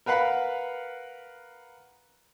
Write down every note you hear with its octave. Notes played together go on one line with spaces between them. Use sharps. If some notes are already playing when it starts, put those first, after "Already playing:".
A#4 B4 F5 F#5 B5